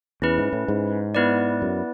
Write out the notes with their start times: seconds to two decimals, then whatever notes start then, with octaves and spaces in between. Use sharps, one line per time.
0.22 E2 C#4 E4 B4
0.38 G#2
0.53 A2
0.68 G#2
1.15 B3 E4 B4 D5
1.62 F#2